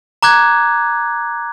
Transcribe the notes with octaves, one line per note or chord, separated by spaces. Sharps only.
A#5 D6 F#6 G#6